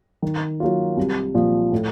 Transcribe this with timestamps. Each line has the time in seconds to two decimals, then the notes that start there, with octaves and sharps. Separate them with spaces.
0.22 D#3
0.60 F#3 A#3 F4
0.97 C2
1.34 A#2 F3
1.72 A2